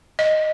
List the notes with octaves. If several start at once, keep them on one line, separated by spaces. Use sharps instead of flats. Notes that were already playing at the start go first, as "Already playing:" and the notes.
D#5